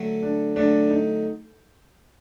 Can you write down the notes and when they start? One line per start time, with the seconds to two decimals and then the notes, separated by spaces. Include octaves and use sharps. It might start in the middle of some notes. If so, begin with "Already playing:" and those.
Already playing: D3 F#3 A3
0.22 D4
0.56 D3 F#3 A3 D4
0.90 D#4